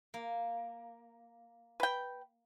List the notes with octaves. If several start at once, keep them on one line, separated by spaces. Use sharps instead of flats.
A#3
B4 G5